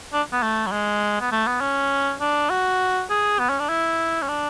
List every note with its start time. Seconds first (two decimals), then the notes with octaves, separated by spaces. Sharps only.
0.13 D4
0.32 B3
0.42 A3
0.66 F#3
0.72 G#3
1.21 B3
1.32 A3
1.47 B3
1.61 C#4
2.21 D4
2.50 F#4
3.10 G#4
3.39 B3
3.50 C#4
3.59 D4
3.69 E4
4.22 C#4
4.28 D4